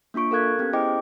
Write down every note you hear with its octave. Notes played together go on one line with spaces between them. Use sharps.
A#3 D4 F4 C#6 D7
A4 A#4 F5 F#6 G#6
B3 C#4 G4
E4 G#4 C5 D#5 G5 D6